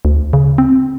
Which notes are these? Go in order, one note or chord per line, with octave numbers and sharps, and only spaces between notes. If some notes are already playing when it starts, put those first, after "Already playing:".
D2
C#3
C4